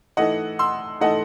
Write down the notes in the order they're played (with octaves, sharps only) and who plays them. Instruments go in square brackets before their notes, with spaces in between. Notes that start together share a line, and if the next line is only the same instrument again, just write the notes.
[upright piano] E3 A3 D#4 A4 [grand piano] D#5 F#5
[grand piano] C6 E6
[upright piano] E3 A3 D#4 A4 [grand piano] D#5 F#5